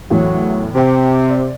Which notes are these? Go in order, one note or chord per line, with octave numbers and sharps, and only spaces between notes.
E2 A2 E3 F#3
C3 G4 G5
D5